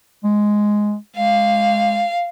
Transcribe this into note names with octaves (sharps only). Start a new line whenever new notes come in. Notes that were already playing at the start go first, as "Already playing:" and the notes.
G#3
G#3 F5